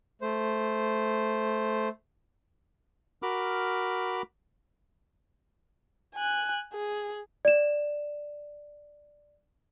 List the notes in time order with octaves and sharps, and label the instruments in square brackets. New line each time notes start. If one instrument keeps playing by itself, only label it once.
[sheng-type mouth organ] A3 C5
[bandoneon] F#4 A#4 B5 D6 F6
[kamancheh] G#5 F#6
G#4
[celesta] D5 E7